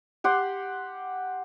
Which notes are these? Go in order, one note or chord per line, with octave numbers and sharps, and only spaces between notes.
G4 F#5 C6